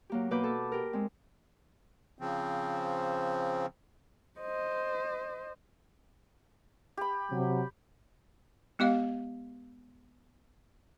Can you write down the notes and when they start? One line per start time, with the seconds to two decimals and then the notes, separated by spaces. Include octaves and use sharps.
0.10 F#3 A#3 G4
0.31 B2 A#3 B4 D6 G6
0.44 A4
0.72 G4 A#4
0.93 G#3 C4
2.19 C#3 F3 C4
4.40 C5 D#5
6.97 G4 B5
7.31 C3 F#3
8.79 G#3 B3 G4 D#5 F5